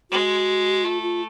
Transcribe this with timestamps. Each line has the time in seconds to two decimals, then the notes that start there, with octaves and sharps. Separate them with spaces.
0.11 G#3 F#4
0.84 A3 F4
1.02 F4